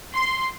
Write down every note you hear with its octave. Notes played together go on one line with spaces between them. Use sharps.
C6